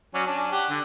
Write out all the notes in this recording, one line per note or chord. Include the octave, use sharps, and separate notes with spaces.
F#3 C#4 D5
C#4 D4
G4 F#5
D3